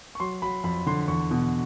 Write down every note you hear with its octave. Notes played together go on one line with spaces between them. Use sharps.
C#6
F#3 C6
F#3 B5
F2 B5
D3 C6
E2 C#6
B2